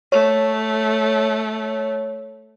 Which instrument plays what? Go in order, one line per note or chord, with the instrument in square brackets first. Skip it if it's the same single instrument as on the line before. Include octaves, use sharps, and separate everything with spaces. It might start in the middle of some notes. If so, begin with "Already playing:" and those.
[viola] A3 [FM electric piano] C#5